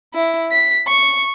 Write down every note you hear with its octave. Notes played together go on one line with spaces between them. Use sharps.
E4
B6
C#6